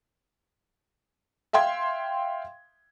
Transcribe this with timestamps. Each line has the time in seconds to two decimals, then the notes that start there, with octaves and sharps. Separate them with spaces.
1.53 E5 F5 G5 C6 G#6